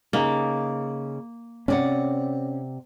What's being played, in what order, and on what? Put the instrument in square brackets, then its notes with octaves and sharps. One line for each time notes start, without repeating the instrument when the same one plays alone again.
[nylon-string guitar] C#3 D#4 [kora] A#3
[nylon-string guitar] C3 D5 F#5 [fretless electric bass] C#4